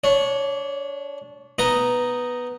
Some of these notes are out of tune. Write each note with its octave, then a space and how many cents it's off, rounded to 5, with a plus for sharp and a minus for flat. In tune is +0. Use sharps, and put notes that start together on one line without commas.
D4 -25 C#5 +0
B3 +0 D#4 +0 A#5 +0